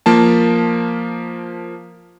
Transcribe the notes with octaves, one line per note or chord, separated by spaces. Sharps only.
F3 A#3 A5